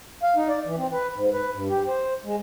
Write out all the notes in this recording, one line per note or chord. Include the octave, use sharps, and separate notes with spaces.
F5
D#4
D5
E3
C4
B4
G#2
B4
G2
G4
C5
G#3